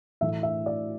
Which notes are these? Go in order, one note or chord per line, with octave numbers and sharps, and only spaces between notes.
A2 E3 A3 E5
E5
D5